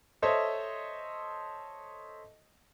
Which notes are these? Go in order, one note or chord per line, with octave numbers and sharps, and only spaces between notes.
A4 C5 C#5 D#5 E5